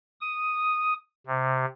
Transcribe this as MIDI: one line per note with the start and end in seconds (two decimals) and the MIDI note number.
0.21 0.94 87
1.27 1.65 48